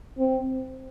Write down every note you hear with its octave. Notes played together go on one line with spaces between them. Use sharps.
C4